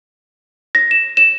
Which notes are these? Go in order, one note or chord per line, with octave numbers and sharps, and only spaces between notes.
A#6
E7
E7